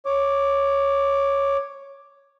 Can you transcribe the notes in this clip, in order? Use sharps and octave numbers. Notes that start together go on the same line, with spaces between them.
C#5 D6